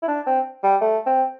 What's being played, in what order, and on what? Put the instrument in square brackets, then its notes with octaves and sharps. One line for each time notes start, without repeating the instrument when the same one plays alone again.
[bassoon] E4
D4
C4
G3
A3
C4